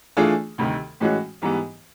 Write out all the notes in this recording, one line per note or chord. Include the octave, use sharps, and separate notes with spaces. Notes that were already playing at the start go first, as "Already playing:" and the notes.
E3 A3 D4 F4 G#4
D2 C3 D#3 G3
A2 E3 G#3 C#4 F#4
G#2 E3 G3 B3